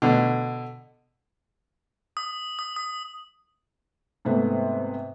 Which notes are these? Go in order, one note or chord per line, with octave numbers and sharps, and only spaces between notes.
B2 D3
D#6
D#6
D#6
G#2 C3 A3 B3